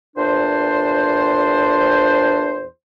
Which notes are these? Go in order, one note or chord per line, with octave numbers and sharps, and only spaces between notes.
E2 A#2 D4 C5